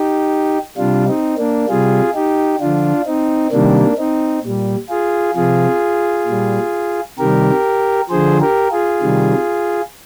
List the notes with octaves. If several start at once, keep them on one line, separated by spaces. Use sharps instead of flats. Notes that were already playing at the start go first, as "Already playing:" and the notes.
Already playing: D#4 G4
C3 G3 D4 F4
C4 D#4
A#3 D4
C3 G3 F4 G#4
D#4 G4
D3 F3 D4 F4
C4 D#4
C3 D#3 G3 A#3 D4
C4 D#4
A#2 G3
F4 G#4
C3 F3 F4 G#4
A#2 G3
C3 D#3 G3 G4 A#4
D3 F3 G#4 C5
G4 A#4
F4 G#4
C3 D#3 G3